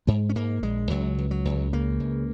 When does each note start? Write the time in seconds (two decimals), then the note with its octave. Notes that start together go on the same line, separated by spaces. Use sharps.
0.07 G#2 G#3
0.29 C#4
0.35 G#2 A#3
0.63 A#1 G#3
0.90 C#2 F#3
1.18 C#2
1.31 F#3
1.45 C#2
1.73 C#3 A#3
2.00 C#2